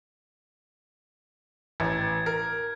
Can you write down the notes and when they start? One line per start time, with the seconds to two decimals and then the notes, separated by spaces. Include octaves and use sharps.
1.80 A1 G#6
2.26 A#4